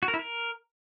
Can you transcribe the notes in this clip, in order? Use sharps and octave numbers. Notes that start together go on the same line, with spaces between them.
F#4
A#4
E4
A#4